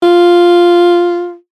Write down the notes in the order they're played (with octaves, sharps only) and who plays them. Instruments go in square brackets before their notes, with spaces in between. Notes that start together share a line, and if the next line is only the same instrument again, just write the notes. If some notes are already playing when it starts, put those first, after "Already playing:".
[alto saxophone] F4